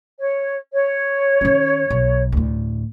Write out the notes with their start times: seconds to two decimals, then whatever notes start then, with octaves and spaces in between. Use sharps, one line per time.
0.20 C#5
0.73 C#5
1.41 D#3 C#4
1.90 B1
2.32 D2 A2